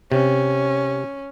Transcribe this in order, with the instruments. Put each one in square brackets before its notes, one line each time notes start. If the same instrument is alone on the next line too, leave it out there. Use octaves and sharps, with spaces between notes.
[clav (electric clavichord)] C3 [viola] C#4